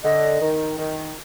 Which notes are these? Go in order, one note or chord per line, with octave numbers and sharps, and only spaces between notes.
D3 D#5
D#3
D#3